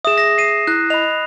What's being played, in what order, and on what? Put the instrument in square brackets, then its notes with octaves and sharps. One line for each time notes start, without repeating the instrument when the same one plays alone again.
[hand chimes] G#4 E5 [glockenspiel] D#6 E7
[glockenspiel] A#6
C7 D#7
[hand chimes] E4 [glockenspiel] F#6
[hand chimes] D#5 B5 [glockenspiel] F7